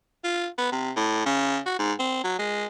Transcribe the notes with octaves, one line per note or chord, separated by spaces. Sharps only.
F4
B3
C3
A2
C#3
F#4
G#2
C4
F#3
G#3